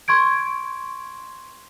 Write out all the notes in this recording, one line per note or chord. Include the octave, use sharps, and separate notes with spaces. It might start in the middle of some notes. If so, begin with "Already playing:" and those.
C6 C#6 G#6 D7